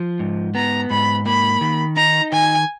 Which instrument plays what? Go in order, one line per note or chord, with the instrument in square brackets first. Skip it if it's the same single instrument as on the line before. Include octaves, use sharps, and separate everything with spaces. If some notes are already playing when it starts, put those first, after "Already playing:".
Already playing: [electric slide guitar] F3
G#2
[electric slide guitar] B3 [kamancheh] A#5
[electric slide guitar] G#2 [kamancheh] B5
[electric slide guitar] A#3 [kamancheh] B5
[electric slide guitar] D#3
[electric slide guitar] D#4 [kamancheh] A#5
[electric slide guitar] D#3 [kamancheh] G#5